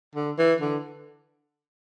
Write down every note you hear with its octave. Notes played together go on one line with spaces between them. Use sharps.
D3
E3
D3